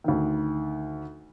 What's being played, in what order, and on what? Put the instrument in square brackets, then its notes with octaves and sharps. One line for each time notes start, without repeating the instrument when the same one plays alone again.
[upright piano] D2 D#3